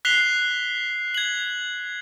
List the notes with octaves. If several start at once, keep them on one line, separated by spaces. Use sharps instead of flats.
F#6 B6 C7 F7 G7
G#6 F#7